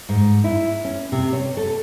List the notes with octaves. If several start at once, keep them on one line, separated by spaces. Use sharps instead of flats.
G#2
E4
C#4
C3
C#5
A4